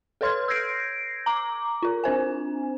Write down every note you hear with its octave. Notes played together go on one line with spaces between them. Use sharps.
A4 B4 C#5 C6 F6 G#6
E6 G6 G#6 A#6 C7 D7
A#5 D6
F4 A#4
C4 D4 C5 G#5